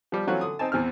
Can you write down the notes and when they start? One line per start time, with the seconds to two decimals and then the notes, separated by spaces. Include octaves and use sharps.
0.12 F3 G3
0.27 E3 F#3 A3 C4 C#4 F4
0.41 D3 D#6
0.59 C4 D#4 G#5 A5
0.72 E2 E3 C4 F6